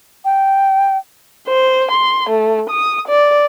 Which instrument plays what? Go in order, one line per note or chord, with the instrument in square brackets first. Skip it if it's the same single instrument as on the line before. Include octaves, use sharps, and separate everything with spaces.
[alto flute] G5
[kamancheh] C5
C6
A3
D#6
D5